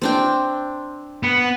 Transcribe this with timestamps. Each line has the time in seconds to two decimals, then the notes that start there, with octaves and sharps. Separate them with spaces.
0.02 C4 D4 G5
1.23 B3